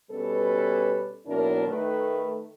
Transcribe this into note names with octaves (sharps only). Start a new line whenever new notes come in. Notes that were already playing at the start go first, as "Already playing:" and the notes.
B2 G3 C#4 A4 B4
D#2 B2 F#3 D4 E4 A#4
D#3 A3 B4